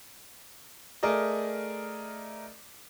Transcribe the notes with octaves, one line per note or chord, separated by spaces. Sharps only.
A3 G#4 A#4 D5 D#5